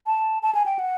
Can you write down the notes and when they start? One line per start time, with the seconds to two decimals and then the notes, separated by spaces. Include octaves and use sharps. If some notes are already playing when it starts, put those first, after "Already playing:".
0.07 A5
0.43 A5
0.55 G#5
0.66 G5
0.79 F#5